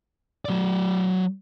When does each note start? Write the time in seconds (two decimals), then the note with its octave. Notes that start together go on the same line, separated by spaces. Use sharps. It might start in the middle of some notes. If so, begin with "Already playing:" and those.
0.45 F#3 D5